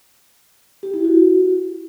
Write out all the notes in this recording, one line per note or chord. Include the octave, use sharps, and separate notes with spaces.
G4
E4
F#4